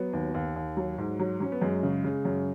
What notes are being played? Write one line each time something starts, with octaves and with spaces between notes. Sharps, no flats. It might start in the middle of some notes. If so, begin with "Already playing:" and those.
Already playing: F#3 B3
D#2
D#2
D#2
F#3
G#2
F#3
F#3 C#4
B3
F#2 G#3
C#3
C#3
F#2